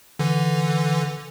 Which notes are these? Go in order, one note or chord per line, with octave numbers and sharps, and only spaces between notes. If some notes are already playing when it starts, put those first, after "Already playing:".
D3 E3